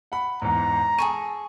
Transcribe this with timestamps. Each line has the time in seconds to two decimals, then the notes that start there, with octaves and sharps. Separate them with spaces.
0.12 F#5 B5
0.42 E2 G#2 A#5
0.98 G#4 A4 C#6 D#7